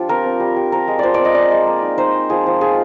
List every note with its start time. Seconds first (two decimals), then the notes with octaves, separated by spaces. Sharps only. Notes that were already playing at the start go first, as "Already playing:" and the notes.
Already playing: F3 D4 F4 G4
0.09 C4 A#4
0.25 C4
0.40 G3
0.56 G3
0.72 F3 A#4
0.88 G#3
0.99 F3 C5 D5
1.14 D5
1.20 C4
1.25 D#5
1.35 G#3 D5
1.51 G#3
1.67 A#3
1.82 D#4
1.98 D#4 C5
2.14 G#3
2.30 F3 G#4
2.46 F3
2.61 F4 G#4